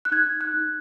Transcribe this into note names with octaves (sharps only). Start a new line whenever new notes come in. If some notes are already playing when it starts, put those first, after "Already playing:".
F#6
D#4 G#6
F#6
D#4